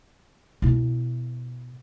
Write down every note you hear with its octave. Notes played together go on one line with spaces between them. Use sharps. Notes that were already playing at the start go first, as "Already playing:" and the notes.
B2 E4